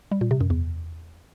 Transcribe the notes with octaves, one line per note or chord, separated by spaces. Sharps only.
G3
A#2
C3
F#2
E2